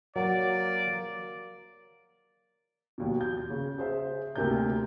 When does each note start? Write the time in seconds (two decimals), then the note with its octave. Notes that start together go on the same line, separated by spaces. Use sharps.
0.16 F#3 A#3 D5
2.98 A#1 D#2 B2
3.21 G6
3.50 C#3
3.78 G#4 C5 E5
4.35 D2 C3 A#3 A#4 G6